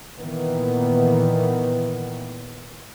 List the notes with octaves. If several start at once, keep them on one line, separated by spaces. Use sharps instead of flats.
A#2 D#3 E3 B3